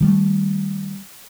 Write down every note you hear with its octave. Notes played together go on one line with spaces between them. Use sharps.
D#3 G3 A3